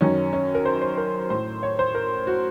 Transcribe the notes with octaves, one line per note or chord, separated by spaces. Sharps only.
F#2 D#3 C#4
C#4
A#4
C5
C5
A#4
A2 C5
C#5
C5
A#4
F#4